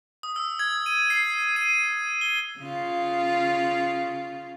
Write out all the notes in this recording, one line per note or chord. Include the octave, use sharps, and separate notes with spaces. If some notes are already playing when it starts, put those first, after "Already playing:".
D#6
E6
G#6
D#7
C7
D#7
G7
C#3 F4